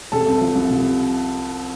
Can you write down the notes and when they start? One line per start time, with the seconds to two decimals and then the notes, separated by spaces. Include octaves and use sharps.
0.12 C3 A4 A5
0.26 C2
0.41 F3
0.55 C2
0.70 C3